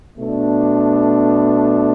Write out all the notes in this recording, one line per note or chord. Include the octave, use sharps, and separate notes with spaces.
B2 A3 D4